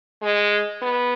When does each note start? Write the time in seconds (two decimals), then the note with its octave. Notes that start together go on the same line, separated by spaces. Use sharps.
0.22 G#3
0.82 B3